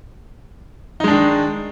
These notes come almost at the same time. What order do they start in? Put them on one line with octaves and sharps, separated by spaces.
D#4 G#3 D4 D#3